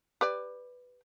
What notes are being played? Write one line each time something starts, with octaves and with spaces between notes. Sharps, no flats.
G4 B4 D5